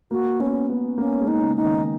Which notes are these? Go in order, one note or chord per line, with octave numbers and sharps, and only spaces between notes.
A#3 F#4
B3 C#4
B3
A#3 C#4
G#3
D#4
C#3
D#4
D#3